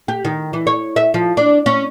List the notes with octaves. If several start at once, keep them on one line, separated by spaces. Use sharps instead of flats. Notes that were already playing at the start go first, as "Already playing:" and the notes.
G4
D#3
E3
C#5
E5
F3
D4
C#4